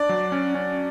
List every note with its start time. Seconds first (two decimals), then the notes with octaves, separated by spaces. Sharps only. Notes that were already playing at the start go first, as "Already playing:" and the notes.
Already playing: D4 D5
0.09 F#3
0.32 C#4
0.55 C#4